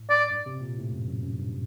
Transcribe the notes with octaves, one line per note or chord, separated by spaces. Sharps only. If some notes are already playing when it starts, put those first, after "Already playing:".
Already playing: A2
D5
G2
C3
A#2
A2
F#2
F#2
F#2
G2